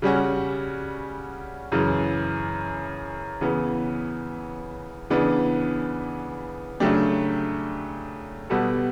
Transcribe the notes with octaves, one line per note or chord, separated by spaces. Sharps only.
C#3 G3 C#4 F#4
F#2 C#3 E3
C#3 E3 B3
C#3 E3 B3 D4
C#3 F#3 A3 D4 G4
B2 G3 B3 F#4 A4